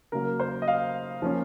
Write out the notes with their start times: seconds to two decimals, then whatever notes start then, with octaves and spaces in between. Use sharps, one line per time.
0.12 C#3 F#3 A#3 A#4
0.40 C5
0.62 D#5
0.68 F5
1.22 F3 A#3 C#4